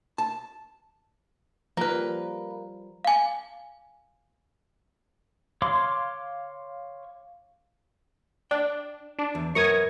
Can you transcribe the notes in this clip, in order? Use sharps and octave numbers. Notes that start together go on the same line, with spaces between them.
A5
F3 G3 A#3 A#4 B4 A#5
F5 G#5
C#5 F5 C6 D6
D4 G5
D4
E2
F#2 A#4 B4 C#6 D#6 G#6